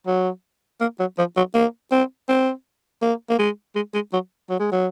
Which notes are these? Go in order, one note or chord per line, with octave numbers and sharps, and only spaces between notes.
F#3
A#3
F#3
F3
F#3
A#3
C4
C4
A#3
A#3
G#3
G#3
G#3
F#3
F#3
G#3
F#3